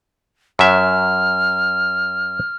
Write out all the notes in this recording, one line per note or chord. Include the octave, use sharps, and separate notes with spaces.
F#2 F#3 E5 F6